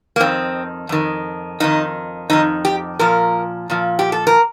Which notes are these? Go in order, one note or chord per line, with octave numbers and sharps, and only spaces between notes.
A#3
F2 D#3 C4
F2 D#3
F2 D#3 D#4
F2 D#3 D#4
G4
A#2 F3 A#4
A#2 F3
G4
A4
A#4